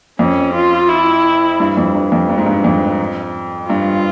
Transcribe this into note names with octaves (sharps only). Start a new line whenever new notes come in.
F2 C#4
F4
E4
G2
F2
G2
F2
G2
G#2
G2
F2
G2 F4